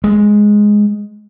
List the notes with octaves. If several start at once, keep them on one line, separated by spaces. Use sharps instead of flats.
G#3